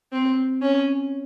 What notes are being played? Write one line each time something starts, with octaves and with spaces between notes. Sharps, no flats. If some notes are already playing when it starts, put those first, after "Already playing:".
C4
C#4